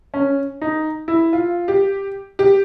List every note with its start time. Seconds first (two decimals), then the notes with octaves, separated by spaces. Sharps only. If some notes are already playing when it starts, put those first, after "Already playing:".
0.14 C#4
0.62 D#4
1.08 E4
1.33 F4
1.68 G4
2.39 G4